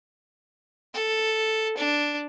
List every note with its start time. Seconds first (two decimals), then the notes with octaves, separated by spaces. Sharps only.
0.94 A4
1.77 D4